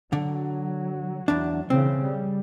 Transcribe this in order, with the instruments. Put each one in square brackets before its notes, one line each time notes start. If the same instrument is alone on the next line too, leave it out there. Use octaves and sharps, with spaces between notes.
[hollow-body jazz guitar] D3 [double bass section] F#3
[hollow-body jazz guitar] E2 D4
[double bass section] C#3 E3 [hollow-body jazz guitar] C4
[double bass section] G3